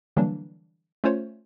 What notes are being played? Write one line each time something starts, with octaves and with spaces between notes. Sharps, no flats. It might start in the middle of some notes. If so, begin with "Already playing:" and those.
D3 E3 F#3 G3 A#3 D4
A3 C#4 F4 C5 C#5